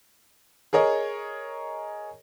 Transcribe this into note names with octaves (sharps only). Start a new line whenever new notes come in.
G#4 A#4 C#5 D#5